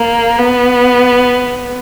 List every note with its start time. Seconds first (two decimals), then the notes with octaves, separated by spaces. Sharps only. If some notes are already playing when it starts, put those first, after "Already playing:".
Already playing: A#3
0.39 B3